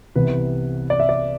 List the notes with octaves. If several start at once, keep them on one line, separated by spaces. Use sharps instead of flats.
C2 C3 E3 B3 B4
D5
E5
D5